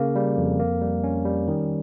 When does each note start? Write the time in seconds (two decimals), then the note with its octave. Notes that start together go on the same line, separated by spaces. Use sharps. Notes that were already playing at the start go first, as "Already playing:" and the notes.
Already playing: C#3 A#3
0.16 G3
0.38 F2
0.60 A#3
0.81 G3
1.04 C#4
1.25 G3
1.48 D#3